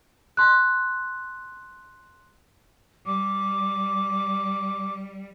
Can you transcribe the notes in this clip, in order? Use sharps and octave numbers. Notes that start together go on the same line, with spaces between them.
A5 C6 F#6
G3 D6